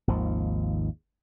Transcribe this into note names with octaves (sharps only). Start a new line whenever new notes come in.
G#1 D#2 F3